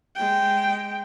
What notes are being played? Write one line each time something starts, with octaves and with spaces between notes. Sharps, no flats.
G#3 G5